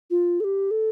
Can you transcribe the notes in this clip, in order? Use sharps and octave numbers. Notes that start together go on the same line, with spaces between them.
F4
A4
G4
A4